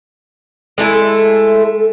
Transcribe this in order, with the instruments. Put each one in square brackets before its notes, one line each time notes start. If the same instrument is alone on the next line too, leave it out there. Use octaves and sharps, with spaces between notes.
[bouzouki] G#3 A3 E4 A4